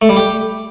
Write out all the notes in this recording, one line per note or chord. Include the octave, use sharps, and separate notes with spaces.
A3
G3
G4